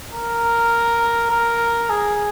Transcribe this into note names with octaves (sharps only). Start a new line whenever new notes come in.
A#4
A#4
G#4